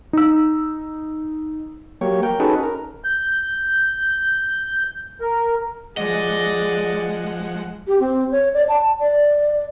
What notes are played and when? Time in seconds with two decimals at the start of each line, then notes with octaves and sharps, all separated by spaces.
0.13 D#4 E6
2.01 F#3 A#3 G4 C#5
2.23 A#4 G5
2.40 C#4 D#4 F#4 G#4 A4 B4
2.63 A#4
3.04 G6
5.21 A#4
5.97 F3 G#3 G#4 D5 D#5 F#5
7.87 G4
8.00 C4
8.31 C#5
8.54 D5
8.69 A5
9.00 D5